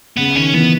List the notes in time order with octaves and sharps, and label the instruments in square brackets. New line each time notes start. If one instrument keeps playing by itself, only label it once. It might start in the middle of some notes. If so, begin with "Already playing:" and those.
[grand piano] C#3 [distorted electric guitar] B3
[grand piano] D#3 [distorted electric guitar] C#4
[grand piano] E3 [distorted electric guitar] B3